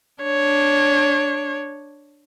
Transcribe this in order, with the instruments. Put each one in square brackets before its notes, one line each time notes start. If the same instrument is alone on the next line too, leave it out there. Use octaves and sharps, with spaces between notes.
[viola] D4 C#5